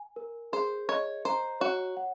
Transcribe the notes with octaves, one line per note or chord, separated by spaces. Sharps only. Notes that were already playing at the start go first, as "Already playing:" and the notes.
Already playing: G#5
A#4
G#4 C5
C#5 D#5
C5 A#5
F#4 C#5
F#5